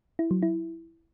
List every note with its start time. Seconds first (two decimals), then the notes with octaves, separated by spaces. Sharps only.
0.19 E4
0.31 F#3
0.42 E4